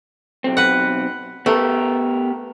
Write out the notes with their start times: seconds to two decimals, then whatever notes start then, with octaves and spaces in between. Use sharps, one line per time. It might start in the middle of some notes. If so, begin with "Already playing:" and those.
0.44 B1 C4
0.57 B4 F#5
1.46 A3 B3 G4 A#4